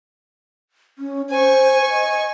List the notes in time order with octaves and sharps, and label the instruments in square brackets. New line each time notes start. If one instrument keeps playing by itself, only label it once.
[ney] C#4
[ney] C5 [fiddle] G#5 C#6
[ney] D#5